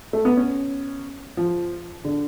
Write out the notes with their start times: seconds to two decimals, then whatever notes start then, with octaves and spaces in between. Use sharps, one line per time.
0.13 A3
0.25 B3
0.37 C#4
1.37 F3
2.05 D3